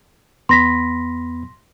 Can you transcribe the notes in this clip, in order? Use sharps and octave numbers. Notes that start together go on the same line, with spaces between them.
E2 B3 B5 C6 A#6 B6